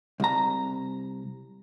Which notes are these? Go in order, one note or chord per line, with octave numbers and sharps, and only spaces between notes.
C2 A#5